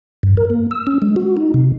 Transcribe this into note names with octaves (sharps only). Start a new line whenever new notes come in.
G2
A#4
A#3
E6
C#4
G#3
F#4
D#4
C3